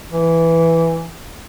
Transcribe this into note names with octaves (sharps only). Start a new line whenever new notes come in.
E3